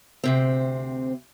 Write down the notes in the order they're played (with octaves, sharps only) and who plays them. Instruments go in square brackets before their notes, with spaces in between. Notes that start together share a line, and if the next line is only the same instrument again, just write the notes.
[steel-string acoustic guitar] D2 C3 C4